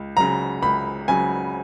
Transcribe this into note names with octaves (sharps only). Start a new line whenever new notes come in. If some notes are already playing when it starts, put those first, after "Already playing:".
Already playing: C#2
C#3 F#3 A#5
C#2 B5
C#3 F#3 G#5